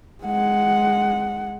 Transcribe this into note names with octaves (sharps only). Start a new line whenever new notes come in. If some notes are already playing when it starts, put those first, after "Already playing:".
G#3 F#5